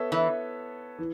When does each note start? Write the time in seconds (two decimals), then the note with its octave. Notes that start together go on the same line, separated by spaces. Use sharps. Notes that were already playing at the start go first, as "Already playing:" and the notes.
Already playing: B3 A4 C#5 E5
0.12 E3
0.98 E3